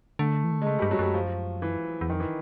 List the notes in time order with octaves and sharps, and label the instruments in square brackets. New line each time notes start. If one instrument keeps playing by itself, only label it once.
[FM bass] D3 [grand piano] A3
[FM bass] E3
D#3
D3
[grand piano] G#3
[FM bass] C#3 [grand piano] A3
[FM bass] G2 [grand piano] G3
[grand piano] F#3
[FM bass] F#2 [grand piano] G3
[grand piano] F3
E3
[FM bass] E2
[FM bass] F2 [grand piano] D#3
[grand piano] E3